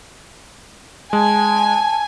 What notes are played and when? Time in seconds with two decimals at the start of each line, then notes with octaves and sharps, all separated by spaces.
1.13 G#3 G#5 A5